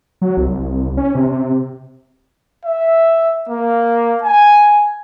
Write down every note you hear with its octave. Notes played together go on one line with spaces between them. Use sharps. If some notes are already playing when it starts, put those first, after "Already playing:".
F#3
C2
C2
C#4
C3
E5
A#3
G#5